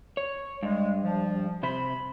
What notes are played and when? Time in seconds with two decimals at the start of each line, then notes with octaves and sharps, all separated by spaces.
0.17 C#5
0.63 G2 G#3
1.03 F3
1.63 C3 C5 B5